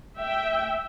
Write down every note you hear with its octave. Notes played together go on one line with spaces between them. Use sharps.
E5 G5